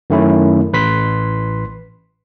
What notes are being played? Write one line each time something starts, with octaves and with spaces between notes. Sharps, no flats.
F#2 D#3 A3 C#4 E4
A1 B4 C6 B6